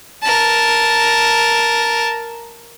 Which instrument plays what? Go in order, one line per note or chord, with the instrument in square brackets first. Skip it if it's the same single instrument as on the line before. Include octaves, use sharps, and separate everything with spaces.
[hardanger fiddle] A#4 A5